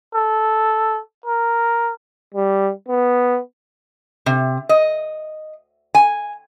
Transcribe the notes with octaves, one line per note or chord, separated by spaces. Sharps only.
A4
A#4
G3
B3
C3
D#5
G#5